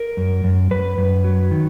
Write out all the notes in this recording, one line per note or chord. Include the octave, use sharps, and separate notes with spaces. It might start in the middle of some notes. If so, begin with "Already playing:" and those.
Already playing: A#4
F#2
F#2
F#2 B4
F#2
F#3
D#3